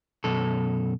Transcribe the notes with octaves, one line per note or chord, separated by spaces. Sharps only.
F#2 B2 A4